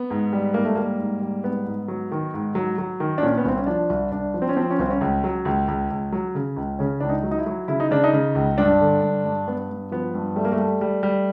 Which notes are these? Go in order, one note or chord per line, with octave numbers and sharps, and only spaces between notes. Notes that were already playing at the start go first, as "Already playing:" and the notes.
Already playing: B3
G#2
G3
G#2 A#3
A3
G3 A#3
G#2
G3
G#2 B3
G#2
F#3
D#3
G#2
F#3
F#3
D#3
D4
A#2 C#4
B3
C2 C4
C#4
F3 D4
C2
C2 D4
F3
C4
C#4
F3 C4
C#4
C2 C4
C#4
C#2
F#3
C#2
C#2
C#2
F#3
C#3
C#2
C#3 C#4
C#2 D4
D#4
F#3
D#4
E4
F#3
C#3 E4
D#4
C#3 D4
D#4
C#3
C#2
G2 D4
D3
G2
G2
G2 B3
G2
F3 B3
G2
G3 A3
A#3
A3
G3
G3
G3